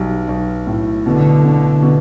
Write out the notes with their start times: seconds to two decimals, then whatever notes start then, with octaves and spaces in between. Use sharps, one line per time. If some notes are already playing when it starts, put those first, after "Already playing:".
Already playing: B1 G3
0.29 B1
0.67 A2
1.05 B2 D3
1.44 B2
1.82 B2